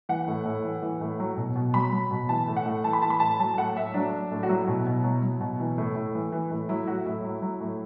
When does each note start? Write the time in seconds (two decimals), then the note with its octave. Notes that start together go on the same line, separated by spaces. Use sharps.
0.09 E3 F#5
0.28 A2
0.46 A2
0.65 E3
0.82 E3
1.01 A2
1.20 F#3
1.37 B2
1.56 B2
1.74 F#3 B5
1.92 F#3
2.11 B2
2.29 E3 A5
2.48 A2
2.57 F#5
2.66 A2
2.84 E3 A5
2.93 B5
3.02 E3 A5
3.10 B5
3.20 A2 A5
3.39 F#3 A5
3.54 A5
3.58 A2 F#5
3.76 A2 E5
3.94 F#3 D4
4.12 F#3
4.31 A2
4.43 F#4
4.49 F#3 E4
4.68 B2
4.87 B2
5.04 F#3
5.23 F#3
5.40 B2
5.60 E3
5.78 A2
5.96 A2
6.15 E3
6.32 E3
6.51 A2
6.69 F#3 E4
6.87 A2 F#4
7.06 A2 E4
7.24 F#3
7.42 F#3
7.61 A2